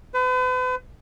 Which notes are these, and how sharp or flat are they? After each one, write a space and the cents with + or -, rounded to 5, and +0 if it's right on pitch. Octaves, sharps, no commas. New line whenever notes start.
B4 +40